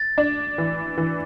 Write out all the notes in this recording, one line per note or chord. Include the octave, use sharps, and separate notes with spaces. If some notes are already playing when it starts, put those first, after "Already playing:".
Already playing: A6
D4
E3
E3